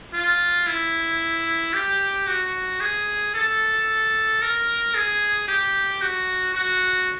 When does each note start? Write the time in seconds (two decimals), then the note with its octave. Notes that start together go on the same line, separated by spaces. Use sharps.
0.14 F4
0.67 E4
1.74 G4
2.27 F#4
2.80 G#4
3.34 A4
4.42 A#4
4.95 G#4
5.48 G4
6.02 F#4
6.55 F#4